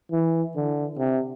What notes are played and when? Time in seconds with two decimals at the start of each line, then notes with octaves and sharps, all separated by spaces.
0.12 E3
0.56 D3
0.98 C3